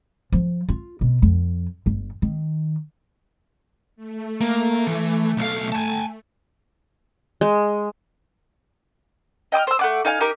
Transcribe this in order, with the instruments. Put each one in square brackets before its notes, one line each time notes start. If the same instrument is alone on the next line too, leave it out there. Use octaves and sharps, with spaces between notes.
[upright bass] F3
F4
B2
F2
G1
D#3
[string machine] A3
[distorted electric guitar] A#3
E3
B1 F5
G#5 A5
[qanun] G#3
[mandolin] D#5 G5 D#6 F6
C5 E6
A3 F#5 D6
D#4 F5 G5 G#5
D#4 G4 A#4 D6